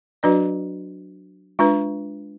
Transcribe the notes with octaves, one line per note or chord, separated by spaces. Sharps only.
F#3 D4 F#4 B4 D5
G#3 D4 F4 B4